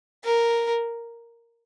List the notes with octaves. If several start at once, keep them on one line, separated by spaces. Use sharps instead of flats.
A#4